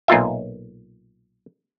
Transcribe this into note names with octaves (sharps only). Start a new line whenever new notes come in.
B1 A#2 F4 E5